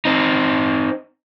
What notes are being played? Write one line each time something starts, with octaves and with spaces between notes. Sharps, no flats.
C4 D#4